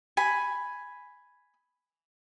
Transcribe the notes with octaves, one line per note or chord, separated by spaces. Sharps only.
G#5 B5